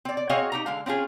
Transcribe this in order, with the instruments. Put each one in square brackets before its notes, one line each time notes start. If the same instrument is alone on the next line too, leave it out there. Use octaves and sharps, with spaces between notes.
[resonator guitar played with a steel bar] C4 D5
D5
C4 F#4 G#4 C#5 D#5 F5
D#4 G4 A#5
D3 G#3 F5
C4 C#4 F4 G#4